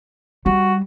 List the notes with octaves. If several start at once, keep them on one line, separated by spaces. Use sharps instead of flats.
G3 F#4